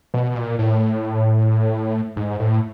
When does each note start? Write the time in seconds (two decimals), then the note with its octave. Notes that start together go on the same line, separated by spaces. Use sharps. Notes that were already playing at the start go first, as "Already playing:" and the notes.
0.14 B2
0.35 A#2
0.59 A2
2.16 G#2
2.40 A2